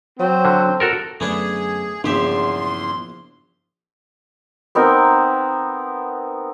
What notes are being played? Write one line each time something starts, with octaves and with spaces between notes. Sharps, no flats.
F#3 C4
D3
F#4 A4 A#4
F#2 D3 F#3 A3 B3 D4 G#4
A#1 E2 G2 C#3 D4 G4 E5 C6
B3 C4 D#4 A#4